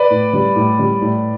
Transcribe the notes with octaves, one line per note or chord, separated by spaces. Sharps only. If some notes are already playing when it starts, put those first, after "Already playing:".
Already playing: B4 D5
A2
G3
A2
G3
A2